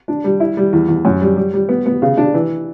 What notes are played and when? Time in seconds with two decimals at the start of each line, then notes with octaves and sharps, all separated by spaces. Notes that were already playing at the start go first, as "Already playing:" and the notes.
0.08 D4
0.24 G3
0.40 E4
0.57 G3
0.73 E2
0.88 E2
1.05 F#2
1.21 G3
1.36 G3
1.54 G3
1.69 B3
1.86 B3
2.02 C#3
2.17 D4
2.34 E3